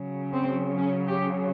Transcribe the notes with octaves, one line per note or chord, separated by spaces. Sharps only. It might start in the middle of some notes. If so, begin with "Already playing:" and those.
Already playing: C#3 F#3
C4
C#4
G4